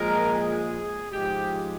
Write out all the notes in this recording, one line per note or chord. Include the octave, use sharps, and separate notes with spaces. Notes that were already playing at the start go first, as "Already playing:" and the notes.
Already playing: A#2 F3 G#3 A#4
G#4
G#2 F3 G#3 G4